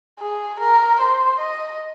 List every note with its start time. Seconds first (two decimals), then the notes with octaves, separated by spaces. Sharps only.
0.19 G#4
0.60 A#4
1.00 C5
1.40 D#5